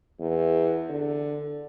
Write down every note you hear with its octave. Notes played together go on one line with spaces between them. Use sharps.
E2
D3